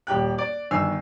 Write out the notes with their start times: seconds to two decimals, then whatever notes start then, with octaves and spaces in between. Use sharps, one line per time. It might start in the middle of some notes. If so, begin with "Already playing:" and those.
0.07 D#1 G4 G5 F#6
0.38 D5
0.71 G1 D#3 G#5 E6 C7